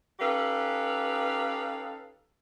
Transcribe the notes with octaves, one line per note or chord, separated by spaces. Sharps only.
C#4 D#4 G4 A4 B4 F5